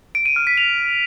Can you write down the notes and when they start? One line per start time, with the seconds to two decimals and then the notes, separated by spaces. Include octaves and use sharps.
0.15 D7
0.26 D#7
0.36 F6
0.47 B6
0.57 F7